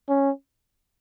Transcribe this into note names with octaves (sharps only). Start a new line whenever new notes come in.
C#4